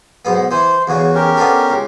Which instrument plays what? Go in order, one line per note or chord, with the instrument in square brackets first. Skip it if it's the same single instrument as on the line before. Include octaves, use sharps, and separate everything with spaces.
[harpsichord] B1 G#2 B3
[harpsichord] E3 [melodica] C5
[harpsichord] E2 C#3 [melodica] F#4
[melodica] C#4 G4 A#4
[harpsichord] B3 D4 A4
C#2